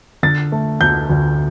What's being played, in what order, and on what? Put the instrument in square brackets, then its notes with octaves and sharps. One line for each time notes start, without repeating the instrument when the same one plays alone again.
[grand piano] D3 A6
A3
D2 G6
D2